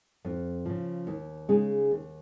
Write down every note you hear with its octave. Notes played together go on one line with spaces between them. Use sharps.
F2
C#3 F3
D#2
C#3 G#3 D#4 G#4
D#2